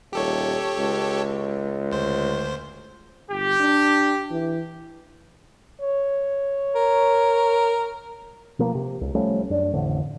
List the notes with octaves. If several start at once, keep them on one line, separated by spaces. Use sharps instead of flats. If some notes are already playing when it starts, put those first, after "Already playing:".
D#1 G4 A4 C#5
C#2
D2 C5
G1 G4
D4
E3
C#5
A#4
B2 F3 A#3
C3
C#2
F3 G3 A3 C#4
F#2 D4
A1 F2 D3